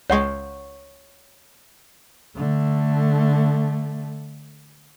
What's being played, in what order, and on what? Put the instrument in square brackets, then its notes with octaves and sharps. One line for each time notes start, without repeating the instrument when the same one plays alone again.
[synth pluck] C#2 G#3 [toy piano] C#5 F#5 C#6
[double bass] D3 A3